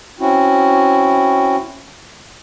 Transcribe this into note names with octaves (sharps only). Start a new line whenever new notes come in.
C4 C#4 E4 F#4